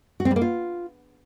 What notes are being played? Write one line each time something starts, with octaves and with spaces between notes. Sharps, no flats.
F#4
C4
G3
A#3
F4